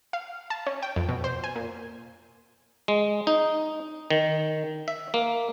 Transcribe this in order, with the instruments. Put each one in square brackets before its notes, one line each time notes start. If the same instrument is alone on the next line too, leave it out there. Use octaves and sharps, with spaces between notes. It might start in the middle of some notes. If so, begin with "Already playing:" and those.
[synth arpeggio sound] F5
A5
C#4
G5
F2
B2
C5
G#5
A#2
[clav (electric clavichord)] G#3
D#4
D#3
E5
A#3